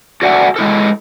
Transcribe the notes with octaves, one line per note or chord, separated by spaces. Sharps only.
F#4 A4 D5 E5 F#5 G#5
G#3 E4 A4